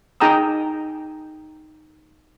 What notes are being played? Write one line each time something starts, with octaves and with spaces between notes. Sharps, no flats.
D#4 G#4 G5 A#5 D#6 E6